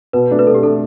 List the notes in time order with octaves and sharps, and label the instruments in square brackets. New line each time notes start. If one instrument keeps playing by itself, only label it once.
[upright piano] B2 [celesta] B4
[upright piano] A3 D4
[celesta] B4
[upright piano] B2 [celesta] A4
[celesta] G4
[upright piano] D4 [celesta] A4
[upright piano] A3